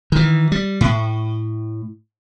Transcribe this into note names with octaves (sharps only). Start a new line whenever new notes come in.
D#3 E3
G3
A2